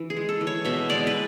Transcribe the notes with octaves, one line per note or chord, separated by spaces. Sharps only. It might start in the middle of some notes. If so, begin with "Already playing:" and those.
Already playing: E3
G#4
G#3
A4
E3
C#5
B2 E5
G#3 D5
B4